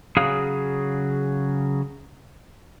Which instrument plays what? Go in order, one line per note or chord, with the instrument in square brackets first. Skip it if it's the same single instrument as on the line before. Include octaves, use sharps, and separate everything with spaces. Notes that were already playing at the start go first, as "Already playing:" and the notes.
[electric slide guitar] C#3 F#3 G#4 F5